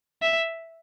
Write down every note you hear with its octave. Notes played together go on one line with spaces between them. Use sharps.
E5